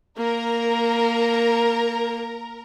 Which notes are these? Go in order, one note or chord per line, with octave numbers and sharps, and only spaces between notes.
A#3 A#4 A#5